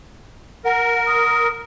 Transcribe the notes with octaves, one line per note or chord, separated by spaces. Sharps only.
A#4 F#5
D#6